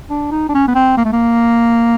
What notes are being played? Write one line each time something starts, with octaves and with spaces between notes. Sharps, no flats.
D4
D#4
D4
C#4
B3
C4
A#3
A3
A#3